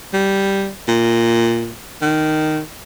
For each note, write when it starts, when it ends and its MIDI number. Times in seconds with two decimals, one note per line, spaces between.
0.14 0.70 55
0.88 1.73 46
2.02 2.60 51